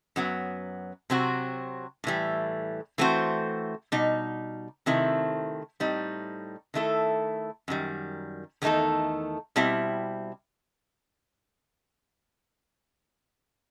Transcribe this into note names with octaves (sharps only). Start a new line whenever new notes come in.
F#2 F#3 B3
C3 F#3 C4 F#4
A2 E3 G3
E3 A3 C4 F#4 C5
B2 G3 D#4
C3 D#3 A3 C4 E4
A2 G3 C4 D#4
D#3 A3 E4 A4
F#2 D#3 G3
E2 D#3 A3 D#4 A4
B2 G3 C4 E4